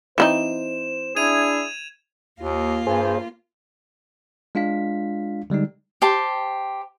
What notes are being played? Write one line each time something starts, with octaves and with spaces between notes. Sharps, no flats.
E3 C4 D#4 C5 E7
D4 E4 G#4 G#6 D#7 F7
D#2 A#3 F4
G2 G#4 C5
G#3 D4 F4 F5 B6
D3 G3 G#3 D#4
G4 C5 A5